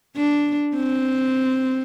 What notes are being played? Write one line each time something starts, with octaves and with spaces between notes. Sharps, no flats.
D4
C4